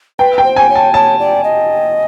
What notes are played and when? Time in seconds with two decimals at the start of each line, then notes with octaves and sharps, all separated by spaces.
0.19 B4 G5
0.38 G5
0.44 C5
0.56 G#5
0.70 C#5
0.75 A5
0.93 C#5 A5
1.19 D5
1.44 D#5